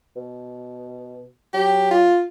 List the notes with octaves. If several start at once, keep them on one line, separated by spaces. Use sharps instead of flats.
B2
F#3 G4
F4